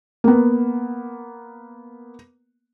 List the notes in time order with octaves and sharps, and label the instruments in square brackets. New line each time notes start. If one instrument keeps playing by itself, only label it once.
[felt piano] A#3 B3